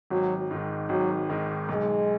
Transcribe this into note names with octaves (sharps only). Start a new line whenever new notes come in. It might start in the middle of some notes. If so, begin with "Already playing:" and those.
G#1 F#3
G#2 D#3
G#1 F#3
G#2 D#3
B1 G#3